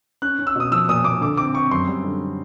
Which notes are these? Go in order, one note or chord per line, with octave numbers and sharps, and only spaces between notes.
C#4 F#6
C#4
E6
B2 D#6
F3 E6
A#2 D#6
A#2 D6
D3 D6
C4 D6
C4 C#6
F#2 C6
G3
D3